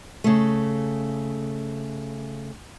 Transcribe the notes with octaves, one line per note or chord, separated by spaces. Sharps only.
C#3 A3